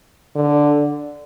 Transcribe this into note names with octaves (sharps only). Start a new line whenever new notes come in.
D3